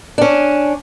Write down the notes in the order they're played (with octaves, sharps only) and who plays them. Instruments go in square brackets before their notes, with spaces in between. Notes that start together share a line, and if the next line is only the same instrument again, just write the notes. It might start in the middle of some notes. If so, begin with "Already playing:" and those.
[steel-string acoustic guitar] C#4 D4